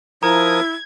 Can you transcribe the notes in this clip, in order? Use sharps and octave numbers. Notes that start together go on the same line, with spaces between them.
F3 E4 A#4 A#5 D#6 G#6